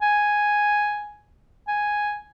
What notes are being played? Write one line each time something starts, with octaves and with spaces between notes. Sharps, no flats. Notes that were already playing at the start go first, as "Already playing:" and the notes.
G#5
G#5